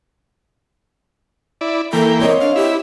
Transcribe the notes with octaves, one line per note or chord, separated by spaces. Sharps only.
E4 D5
E3 A#3 A4 G5
C4 A#4 C#5 D#5
D4 F5
E4 G4